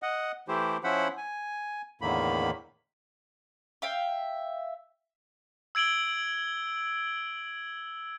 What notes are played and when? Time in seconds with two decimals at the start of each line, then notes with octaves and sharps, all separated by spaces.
0.02 D#5 F#5
0.48 E3 A3 E4 G4 C5
0.84 F3 C#4 E4 C5 F#5 B5
1.17 G#5
2.01 E2 A2 D3 D#3 A#3 B5
3.82 E5 F5 G5
5.75 E6 G#6 D7 F#7 G7